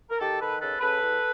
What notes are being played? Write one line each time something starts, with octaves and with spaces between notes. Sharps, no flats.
A#4
D#3 G4 A4
D#3 A4 B4
C#3 A4 B4
C#3 A4 B4
E2